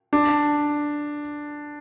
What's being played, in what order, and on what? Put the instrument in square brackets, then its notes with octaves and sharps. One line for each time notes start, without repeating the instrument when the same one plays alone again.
[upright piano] D4